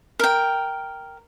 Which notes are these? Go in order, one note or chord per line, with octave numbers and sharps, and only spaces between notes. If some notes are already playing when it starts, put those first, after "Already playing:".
A#4 G5